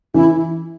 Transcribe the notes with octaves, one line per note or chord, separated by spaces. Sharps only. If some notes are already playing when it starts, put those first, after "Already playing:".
E3 E4